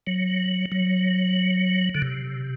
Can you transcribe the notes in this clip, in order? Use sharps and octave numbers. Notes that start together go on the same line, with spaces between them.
F#3
F#3
D3
C3